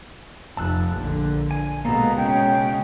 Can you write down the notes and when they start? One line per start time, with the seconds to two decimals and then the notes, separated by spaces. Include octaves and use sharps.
0.57 F1 A5 E6 F#6
0.95 A#1 D3
1.51 G#5
1.85 B2 G#3 A#3 B3 A4 A#5
2.17 C#3 C#4 G5